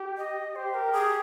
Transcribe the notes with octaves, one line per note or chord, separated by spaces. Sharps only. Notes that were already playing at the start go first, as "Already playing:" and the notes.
Already playing: G4
D#5
G4 C5
A#4
G#4